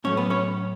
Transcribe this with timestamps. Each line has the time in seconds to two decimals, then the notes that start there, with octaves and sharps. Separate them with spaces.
0.04 A2 F#3 A3 C#4 C#5
0.17 B3 B4
0.30 C#4 C#5